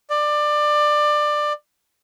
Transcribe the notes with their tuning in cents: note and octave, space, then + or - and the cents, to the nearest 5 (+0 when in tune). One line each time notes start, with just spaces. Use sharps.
D5 +20